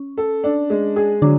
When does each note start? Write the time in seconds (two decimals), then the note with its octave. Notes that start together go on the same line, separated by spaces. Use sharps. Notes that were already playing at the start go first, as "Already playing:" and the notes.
Already playing: C#4
0.17 A4
0.44 D4
0.70 G#3
0.96 G#4
1.22 D3 F#3 D4